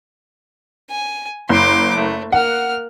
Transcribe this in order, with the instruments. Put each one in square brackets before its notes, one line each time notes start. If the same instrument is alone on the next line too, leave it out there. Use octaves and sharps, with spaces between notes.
[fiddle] G#5
[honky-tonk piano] F#1 [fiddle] C6 D6
[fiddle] A3
[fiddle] A#3 F6 [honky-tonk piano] F#5